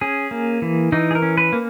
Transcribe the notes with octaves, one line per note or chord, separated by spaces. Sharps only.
C#4 G#4
A#3
E3
E3 D#4
G#4
A#4
C#4
B4
A#3